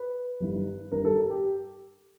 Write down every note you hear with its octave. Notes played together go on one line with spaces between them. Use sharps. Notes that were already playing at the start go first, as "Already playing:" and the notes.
Already playing: B4
G1 G2 D#3
G1 G2 D#3 A#4
A4
G4
G4